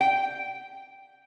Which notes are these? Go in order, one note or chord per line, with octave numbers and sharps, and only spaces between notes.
G5